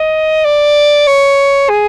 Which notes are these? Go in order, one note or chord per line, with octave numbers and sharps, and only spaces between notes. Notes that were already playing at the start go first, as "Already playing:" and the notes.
Already playing: D#5
D5
C#5
G#4